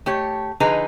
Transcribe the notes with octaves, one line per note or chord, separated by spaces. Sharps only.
A3 G4 C#5
D3 F3 D#4 G#4 B4 A#5